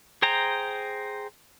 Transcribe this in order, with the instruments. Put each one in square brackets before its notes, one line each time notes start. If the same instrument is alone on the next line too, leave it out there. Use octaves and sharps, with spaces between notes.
[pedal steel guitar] G#4 C5 G5 A#5